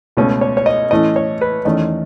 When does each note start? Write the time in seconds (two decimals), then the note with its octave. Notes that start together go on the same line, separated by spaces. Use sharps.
0.17 C#2 B2 A3 C#4
0.41 C#5
0.57 C#5
0.66 D#5
0.91 A2 E3 A3 C#4 D#5
1.16 C#5
1.41 B4
1.65 E2 D#3 A3 C#4 D#5